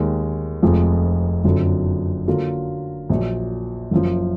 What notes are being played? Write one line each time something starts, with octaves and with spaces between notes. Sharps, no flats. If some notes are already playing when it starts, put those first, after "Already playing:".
Already playing: D#2 D#3 G#3
F1 F2 F3 G#3
F#1 F2 D3 F#3
D3 F#3 A#3 F4 A#4
A#1 A#2 F#3
F#1 F#2 F3